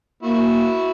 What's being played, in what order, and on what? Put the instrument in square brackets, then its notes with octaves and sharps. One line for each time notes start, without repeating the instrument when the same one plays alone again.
[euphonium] A#3 [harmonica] E4 F#4